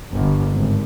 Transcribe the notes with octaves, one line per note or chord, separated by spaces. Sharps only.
G1
G#1